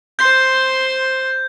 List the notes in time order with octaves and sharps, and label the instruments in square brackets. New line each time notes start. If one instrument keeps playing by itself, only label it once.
[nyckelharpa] C5 C6 [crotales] G6